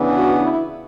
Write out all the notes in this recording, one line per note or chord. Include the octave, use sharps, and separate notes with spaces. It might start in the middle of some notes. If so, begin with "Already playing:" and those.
Already playing: C#3 E3 B3 D4
F#4
E4